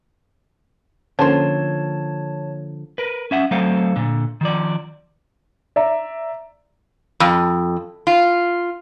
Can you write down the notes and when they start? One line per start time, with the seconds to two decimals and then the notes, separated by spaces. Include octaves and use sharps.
1.19 D3 F3 A#3 C#4 A4 C5 C#5 A5
2.98 A#4 B4
3.31 C#4 E5 F#5
3.51 F#3 A3 C4 A4 C5 F5
3.96 A#2 D3
4.41 D#3 F3 D5
5.76 D5 E5 A#5
7.20 F2
8.07 F4